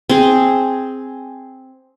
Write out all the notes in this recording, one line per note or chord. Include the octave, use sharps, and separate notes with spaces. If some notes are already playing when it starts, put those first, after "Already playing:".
C4 G#4